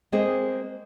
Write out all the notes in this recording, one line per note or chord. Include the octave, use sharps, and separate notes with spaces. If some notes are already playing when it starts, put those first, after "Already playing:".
G#3 A#3 C4 G#4 C5 D#5